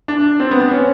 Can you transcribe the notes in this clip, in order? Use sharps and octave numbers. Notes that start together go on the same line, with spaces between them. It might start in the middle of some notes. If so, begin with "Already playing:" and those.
D4
C4
B3
B3
C#4